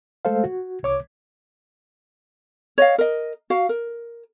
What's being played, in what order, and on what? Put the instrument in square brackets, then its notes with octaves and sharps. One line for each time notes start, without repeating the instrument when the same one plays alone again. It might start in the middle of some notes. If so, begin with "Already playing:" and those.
[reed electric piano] G#3 A3 A4 C5 F5
F#4
C2 C#5 D6
[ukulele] C#5 D#5 F5
A#4 D#5
F#4 F5
A#4